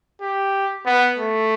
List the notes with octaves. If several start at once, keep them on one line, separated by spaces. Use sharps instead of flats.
G4
B3
A3